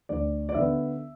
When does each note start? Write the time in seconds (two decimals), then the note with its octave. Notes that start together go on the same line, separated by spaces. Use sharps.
0.09 D2 D5
0.49 D5
0.54 D3 B3 E5